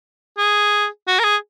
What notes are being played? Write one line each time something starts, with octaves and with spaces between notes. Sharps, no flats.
G#4
F#4
A#4
G#4